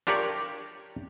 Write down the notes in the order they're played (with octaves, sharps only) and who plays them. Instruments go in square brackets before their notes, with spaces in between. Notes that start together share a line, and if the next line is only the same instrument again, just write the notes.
[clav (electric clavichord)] D4 F4 G4 A#4 C#5 D5